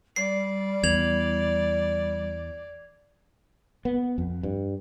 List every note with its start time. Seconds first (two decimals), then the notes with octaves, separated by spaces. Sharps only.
0.16 G3 D5 C7
0.84 E2 G#6 F7 F#7
3.85 B3
4.18 F2
4.43 G2